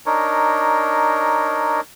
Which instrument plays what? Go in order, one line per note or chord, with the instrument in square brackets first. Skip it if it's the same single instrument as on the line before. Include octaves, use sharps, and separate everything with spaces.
[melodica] D4 D#4 A#4 C#5